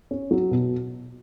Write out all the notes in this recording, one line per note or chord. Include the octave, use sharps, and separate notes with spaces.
C#4
F#3
B2